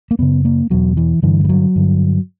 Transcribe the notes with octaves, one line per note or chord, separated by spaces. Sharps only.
A#3
F#2 C#3 B3
A#3
E2 B2 F#3
E3
G2 D3 E3
G3
F#3
G2 D3